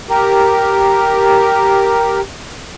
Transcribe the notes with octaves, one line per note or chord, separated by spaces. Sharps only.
G4 A#4